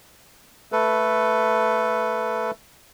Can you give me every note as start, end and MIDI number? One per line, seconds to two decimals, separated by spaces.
0.72 2.51 57
0.72 2.51 69
0.72 2.51 71